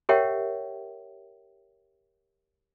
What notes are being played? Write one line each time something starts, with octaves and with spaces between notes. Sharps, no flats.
G4 A#4 C#5 E5 F#5 G5